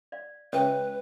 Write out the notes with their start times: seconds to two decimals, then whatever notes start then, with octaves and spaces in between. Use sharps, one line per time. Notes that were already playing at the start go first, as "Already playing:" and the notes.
0.12 D5 F5
0.53 C#2 B4 C#5 E5 G5